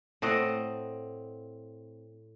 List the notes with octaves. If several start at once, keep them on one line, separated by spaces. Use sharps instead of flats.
A2 C4 D#5 F#5